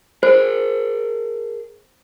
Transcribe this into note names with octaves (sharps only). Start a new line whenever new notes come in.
G#4 A#4 C5